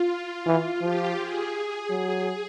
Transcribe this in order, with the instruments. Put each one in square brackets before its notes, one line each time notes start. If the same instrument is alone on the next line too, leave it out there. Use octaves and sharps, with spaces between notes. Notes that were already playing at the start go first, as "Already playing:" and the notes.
Already playing: [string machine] F4
[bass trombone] E3 [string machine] F4
[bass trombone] F3 [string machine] G4
[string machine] G#4
[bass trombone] F#3 [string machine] G#4